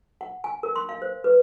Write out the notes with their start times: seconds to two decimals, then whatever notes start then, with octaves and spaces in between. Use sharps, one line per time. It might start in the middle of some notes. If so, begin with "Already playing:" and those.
0.21 F#5
0.44 G#5
0.63 A#4
0.76 C6
0.89 F5
1.02 C5
1.24 B4